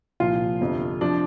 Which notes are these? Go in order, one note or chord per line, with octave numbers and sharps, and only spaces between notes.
C2 A#2 F3 F4
G1 F2 C3 F3
C3 F3 D4